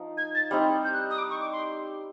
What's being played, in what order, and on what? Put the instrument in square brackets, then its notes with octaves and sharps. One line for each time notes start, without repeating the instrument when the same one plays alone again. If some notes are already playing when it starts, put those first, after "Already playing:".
Already playing: [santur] F3 D#4
[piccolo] G#6
A6
[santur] G3 C4 D#4
[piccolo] G6
F#6
D#6
D6
C#6
D6
C6